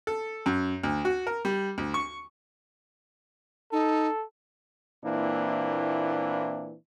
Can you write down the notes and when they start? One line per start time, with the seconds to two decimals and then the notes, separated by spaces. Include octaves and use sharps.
0.07 A4
0.46 F#2
0.83 D2
1.05 F#4
1.27 A#4
1.45 G3
1.78 D2
1.94 C#6
3.72 D#4 A4
5.04 A#2 E3 A#3 C4 D4 E4